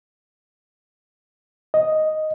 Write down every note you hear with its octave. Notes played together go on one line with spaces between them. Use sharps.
D#5